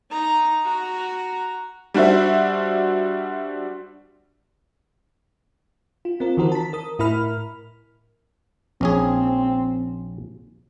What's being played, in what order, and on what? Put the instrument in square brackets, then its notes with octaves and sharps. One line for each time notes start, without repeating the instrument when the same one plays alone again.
[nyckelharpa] D#4 A#5
F#4 A#5
[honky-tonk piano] G3 D4 F#4 C5 E5
[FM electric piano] F4
C4 F4 A#4
D#3 E3 F#4 A#4 C5
A5 B6
A#4 D#6
A2 E4 A#4 B5 F6
[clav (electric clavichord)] A#1 C#4 G#4 [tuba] C4